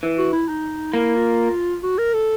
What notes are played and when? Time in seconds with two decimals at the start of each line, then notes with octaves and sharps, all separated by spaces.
0.03 E3
0.18 F#4
0.33 E4
0.49 D#4
0.93 A#3 E4
1.16 F4
1.83 F#4
1.98 A#4
2.13 A4